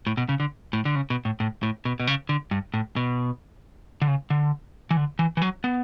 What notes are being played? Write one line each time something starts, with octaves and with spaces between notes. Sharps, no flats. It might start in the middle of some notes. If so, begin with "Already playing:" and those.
A2
B2
C#3
D3
A2
D3
C#3
B2
A2
A2
A2
B2
B2
C#3
D3
G2
A2
B2
D3
C#3
D3
E3
D3
E3
E3
F#3
B3